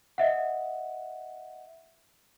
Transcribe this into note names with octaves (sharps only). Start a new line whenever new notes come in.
D#5 E5 F#5